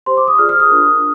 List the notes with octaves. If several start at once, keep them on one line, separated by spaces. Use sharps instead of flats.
G4 C5 C6
D6
D#6
F4 G#4 D5 F6
F6
D#6
D4 F4 A#4